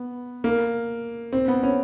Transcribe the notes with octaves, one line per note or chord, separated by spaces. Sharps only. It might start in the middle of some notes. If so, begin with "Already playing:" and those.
Already playing: B3
A#3
C4
B3
C#4